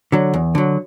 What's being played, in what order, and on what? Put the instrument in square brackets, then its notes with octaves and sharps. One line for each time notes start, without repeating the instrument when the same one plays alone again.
[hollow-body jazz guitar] D3 F#3
E2
D3 F#3